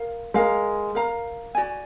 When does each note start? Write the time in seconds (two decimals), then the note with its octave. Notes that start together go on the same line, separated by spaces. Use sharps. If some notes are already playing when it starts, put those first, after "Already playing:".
Already playing: A#4 F5
0.34 G#3 A#4 F5 A#5
0.95 A#4 F5 A#5
1.55 F#4 D5 G#5